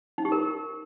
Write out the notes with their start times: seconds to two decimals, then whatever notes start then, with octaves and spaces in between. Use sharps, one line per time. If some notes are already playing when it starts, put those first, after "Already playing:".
0.18 D#4
0.25 G4
0.32 A#4